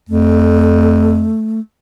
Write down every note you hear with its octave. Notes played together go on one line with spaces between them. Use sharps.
F2 A3